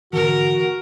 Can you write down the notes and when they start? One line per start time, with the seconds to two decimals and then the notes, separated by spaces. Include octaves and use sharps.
0.13 G#2 D3 E3 F#4 A#4